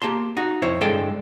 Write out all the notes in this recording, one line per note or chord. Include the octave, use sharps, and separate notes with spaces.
A#3 G4 A5 C6
D#4 F#4
F2 E4 C5 C#5
G2 D3 G#3 A4 G5 C6